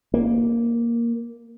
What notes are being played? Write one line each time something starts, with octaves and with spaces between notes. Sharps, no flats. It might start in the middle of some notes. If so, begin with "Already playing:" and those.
A#3